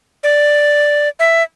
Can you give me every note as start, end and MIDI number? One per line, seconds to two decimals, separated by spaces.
0.23 1.08 74
1.19 1.43 76